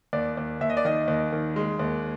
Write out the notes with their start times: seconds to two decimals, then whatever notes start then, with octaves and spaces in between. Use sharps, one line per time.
0.13 D#2 D5
0.37 D#2
0.61 D#2 E5
0.70 D#5
0.77 D5
0.85 D#3 D#5
1.08 D#2
1.32 D#3
1.56 G#3
1.79 D#2